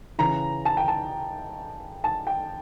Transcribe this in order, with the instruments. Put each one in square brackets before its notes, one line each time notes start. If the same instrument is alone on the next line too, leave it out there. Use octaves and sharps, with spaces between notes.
[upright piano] C#3 E3 A#5
A5
G5
A5
A5
G5